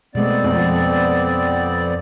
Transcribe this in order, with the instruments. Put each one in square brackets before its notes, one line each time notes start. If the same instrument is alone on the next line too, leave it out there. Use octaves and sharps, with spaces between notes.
[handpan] B2 G#3 A3 [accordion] B3 C4 D5
[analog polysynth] F2